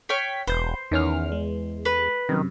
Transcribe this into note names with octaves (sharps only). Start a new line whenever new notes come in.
C#5 G5 F6 B6
E1 B4 C5 G6
E2 D#3 C#4 F6
G#3
B4
F#2 C3 D#3